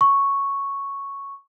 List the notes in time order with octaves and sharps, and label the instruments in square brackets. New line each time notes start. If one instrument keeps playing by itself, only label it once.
[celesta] C#6